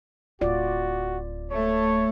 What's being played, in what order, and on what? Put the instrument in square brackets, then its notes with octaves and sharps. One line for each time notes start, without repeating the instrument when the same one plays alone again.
[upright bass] D1 [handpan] F4 D5 [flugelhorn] F#4
[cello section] A3 [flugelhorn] C#5